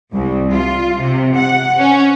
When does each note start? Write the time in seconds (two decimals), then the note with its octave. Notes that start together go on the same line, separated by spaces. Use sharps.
0.14 C2
0.52 F4
0.99 C3
1.37 F#5
1.79 C#4